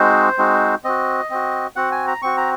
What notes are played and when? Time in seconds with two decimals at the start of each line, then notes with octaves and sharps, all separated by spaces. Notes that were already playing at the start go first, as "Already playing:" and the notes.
Already playing: G#3 C4 D#4 F#4 C5
0.38 G#3 C4 D#4 F#4
0.84 C4 F#4 D#5
1.30 C4 F#4
1.76 C4 F#4 F#5
1.92 G#5
2.07 A#5
2.22 C4 F#4 C#6
2.37 A#5